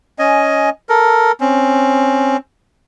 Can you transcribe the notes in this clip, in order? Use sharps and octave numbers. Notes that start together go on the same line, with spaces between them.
C#4 D#5 G#5
A4 A#4
C4 C#4